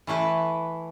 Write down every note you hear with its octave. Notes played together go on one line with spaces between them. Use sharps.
E3 A3 E4 B4